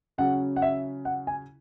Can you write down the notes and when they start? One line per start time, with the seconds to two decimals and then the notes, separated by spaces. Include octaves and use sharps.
0.18 C#3 F#3 C#4 F#5
0.56 F#5
0.62 E5
1.05 F#5
1.27 G#5